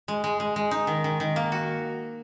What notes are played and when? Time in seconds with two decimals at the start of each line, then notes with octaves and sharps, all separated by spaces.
0.08 G#3
0.24 G#3
0.40 G#3
0.56 G#3
0.71 D#4
0.87 D#3
1.04 D#3
1.20 D#3
1.36 A#3
1.52 F#4